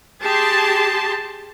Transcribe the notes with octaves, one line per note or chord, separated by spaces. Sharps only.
G4 G#4 A5 C6